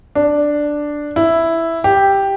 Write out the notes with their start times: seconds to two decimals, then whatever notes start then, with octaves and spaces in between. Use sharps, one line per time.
0.15 D4
1.16 E4
1.84 G4